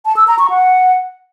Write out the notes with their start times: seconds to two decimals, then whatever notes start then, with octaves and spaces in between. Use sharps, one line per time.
0.06 A5
0.17 E6
0.28 A#5
0.39 C#6
0.50 F#5